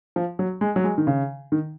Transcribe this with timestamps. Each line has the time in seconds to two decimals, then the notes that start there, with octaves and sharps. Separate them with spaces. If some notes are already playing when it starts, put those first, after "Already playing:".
0.16 F3
0.39 F#3
0.61 G#3
0.76 F#3
0.84 G#3
0.98 D#3
1.07 C#3
1.52 D#3